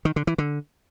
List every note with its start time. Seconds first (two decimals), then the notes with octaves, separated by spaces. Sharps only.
0.05 D#3
0.16 D3
0.27 E3
0.38 D3